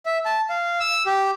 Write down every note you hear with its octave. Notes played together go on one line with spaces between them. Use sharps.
E5
A5
F5
E6
G4